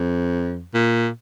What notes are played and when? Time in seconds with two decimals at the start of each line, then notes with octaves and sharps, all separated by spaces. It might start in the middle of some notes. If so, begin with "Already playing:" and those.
Already playing: F2
0.74 A#2